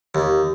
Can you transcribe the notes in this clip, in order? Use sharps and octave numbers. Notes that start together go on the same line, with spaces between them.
D#2